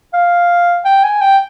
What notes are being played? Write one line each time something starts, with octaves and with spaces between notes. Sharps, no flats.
F5
G5
G#5
G5